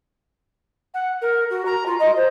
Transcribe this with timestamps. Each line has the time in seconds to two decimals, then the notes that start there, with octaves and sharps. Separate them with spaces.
0.94 F#5
1.21 A#4
1.50 F#4
1.65 A#5
1.86 F4
1.99 D#5
2.16 C5